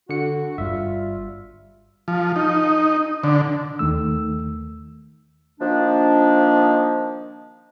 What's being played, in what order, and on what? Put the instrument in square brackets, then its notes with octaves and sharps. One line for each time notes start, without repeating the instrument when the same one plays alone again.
[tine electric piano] D3 C#7 [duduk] F#4
[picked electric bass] G1 G2 G3 [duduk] F4 [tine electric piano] E5
[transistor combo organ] F3
D#4
D3
[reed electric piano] D#2 D#3 A3 E6
[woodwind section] D#3 F3 A#3 D4